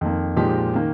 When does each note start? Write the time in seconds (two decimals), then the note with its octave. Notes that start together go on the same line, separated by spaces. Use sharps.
0.01 F2 D#3 A#3
0.36 A#2 F3 G#3 D#4 G4
0.74 D#3 A#3